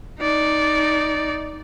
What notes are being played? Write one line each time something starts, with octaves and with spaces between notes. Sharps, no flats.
D#4 D5